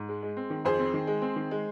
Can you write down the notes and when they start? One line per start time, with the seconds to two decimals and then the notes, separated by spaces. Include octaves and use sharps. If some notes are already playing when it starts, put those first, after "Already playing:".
Already playing: G#2
0.08 G#3
0.23 G#3
0.37 C4
0.50 D#3
0.65 F2 G#4 C5
0.79 C4
0.94 D#3
1.07 G#3
1.22 C4
1.36 D#3
1.51 G#3